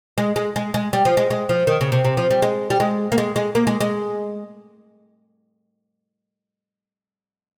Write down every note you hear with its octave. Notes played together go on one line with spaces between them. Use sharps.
G#3
G#3
G#3
G#3
G3
F3
G#3
G#3
F3
D#3
C#3
C3
C3
F3
G3
G#3
G3
G#3
A#3
G#3
G#3
A#3
G#3
G#3